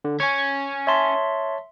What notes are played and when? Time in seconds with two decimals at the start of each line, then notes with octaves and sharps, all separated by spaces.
0.05 D3
0.20 C#4 G#5 C#6 G#6
0.87 C#5 E5 A5 C6